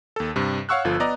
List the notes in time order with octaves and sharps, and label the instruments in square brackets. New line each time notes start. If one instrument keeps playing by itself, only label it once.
[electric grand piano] D#2 A4
G2 C3
C#5 F5 F#5 C#6 E6 F#6
G1 F3 F4 A4
B3 D5 D#5 A#5